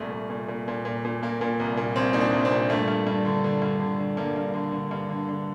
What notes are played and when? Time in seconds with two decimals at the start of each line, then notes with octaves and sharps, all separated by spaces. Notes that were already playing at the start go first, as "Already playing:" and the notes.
Already playing: C2 A#2 A3
0.11 C2
0.30 A#2
0.48 A#2
0.68 A#2
0.85 A#2
1.05 A#2
1.22 A#2 A#3
1.41 A#2
1.60 C2
1.77 A#2
1.96 C2 C4
2.13 A#2 D#4
2.21 D4
2.33 C2
2.45 C4
2.51 A#2
2.70 G2 A3
2.88 G2
3.07 G2
3.25 D3
3.44 D3
3.62 G2
3.80 D3
3.99 D3
4.17 G2 A#3
4.36 G2
4.54 D3
4.72 D3
4.91 G2
5.09 D3
5.29 D3